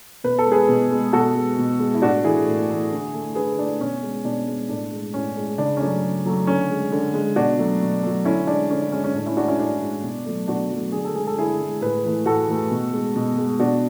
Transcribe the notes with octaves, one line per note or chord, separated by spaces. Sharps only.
B2 B4
A4
G#3
G#4 B4
B2
G#3
B2 F#4 A4
G#3
B2
G#3
E4
A2 D4 F#4
E3 A3 E4 G#4
A2
E3 A3
D3
A3
D3 G#4 B4
A3 D4
B2 C#4
G#3
B2 D4
G#3
A2 D4
G#3
A2 C#4
G#3
C#3 D4
C#4
F#3 A3 D4
C#3
F#3 A3
D3 C#4
G#3
D3
G#3
B2 D4 F#4
F#3 A3
B2
F#3 A3
D3 C#4 E4
G#3 D4
D3 C#4
D4
G#3 C#4
C#4
A2 D4
C#4 E4
G#3 D4 F#4
C#4 E4
A2 D4
G#3
B2
F#3 A3
B2 D4 F#4
F#3 A3
D3 G#4
A4
G#3 G#4
A4
D3 E4 G#4
G#3
A2 G#4 B4
E3 A3
A2 F#4 A4
E3 A3
B2
G#3
B2
G#3
B2 D4 F#4